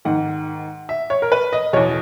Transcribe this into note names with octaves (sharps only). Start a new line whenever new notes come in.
G#2 D#3 F#5
E5
C#5
A#4
B4
D#5
E2 B2 C#5